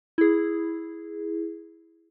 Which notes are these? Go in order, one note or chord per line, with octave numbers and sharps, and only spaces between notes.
E4 G#4